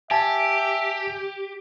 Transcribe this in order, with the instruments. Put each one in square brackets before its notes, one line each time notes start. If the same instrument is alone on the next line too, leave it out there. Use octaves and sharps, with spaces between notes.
[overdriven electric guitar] G4 [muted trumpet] E5 [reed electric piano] G#5 A5